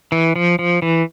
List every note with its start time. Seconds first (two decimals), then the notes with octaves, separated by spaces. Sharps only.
0.12 E3
0.36 F3
0.59 F3
0.82 E3